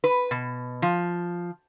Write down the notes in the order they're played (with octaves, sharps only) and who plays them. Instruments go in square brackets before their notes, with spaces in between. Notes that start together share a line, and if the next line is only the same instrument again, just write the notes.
[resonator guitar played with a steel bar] B4
B2
F3